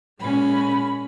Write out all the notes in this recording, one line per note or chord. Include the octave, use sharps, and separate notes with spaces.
A#2 G#3 C#4 B5